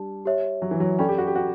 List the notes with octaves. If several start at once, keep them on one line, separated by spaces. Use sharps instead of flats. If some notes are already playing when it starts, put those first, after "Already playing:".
Already playing: G3 D4 G4 A5
G4 C#5 E5
F#3
E3
F#3
C#4 A4 D5 G5 B5
G4
F#4
G4
F#4